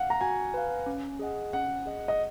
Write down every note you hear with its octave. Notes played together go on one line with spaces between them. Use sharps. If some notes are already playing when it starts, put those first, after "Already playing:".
Already playing: F5 F#5
A#5
F#4 G#5
B4 F5
C#4
G#4 D#5 F#5
C#4 F#5
G#4 D#5 F#5
D#5